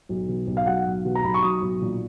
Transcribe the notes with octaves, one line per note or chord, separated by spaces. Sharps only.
B1
B2
B1
F5
F#3 F#5
B1
B2
A#5
B1 B5
C#6
F#3 D#6
B1
A#2